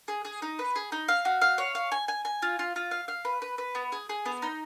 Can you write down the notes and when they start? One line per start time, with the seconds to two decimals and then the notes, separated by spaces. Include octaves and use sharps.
0.08 G#4
0.25 G#4
0.42 D#4
0.59 B4
0.76 G#4
0.92 D#4
1.08 F5
1.25 F#4
1.41 F5
1.58 C#5
1.75 F5
1.92 G#5
2.08 G#5
2.25 G#5
2.42 F4
2.59 F4
2.76 F4
2.91 F5
3.08 F5
3.25 B4
3.42 B4
3.58 B4
3.75 B3
3.92 G#4
4.09 G#4
4.26 B3
4.42 D#4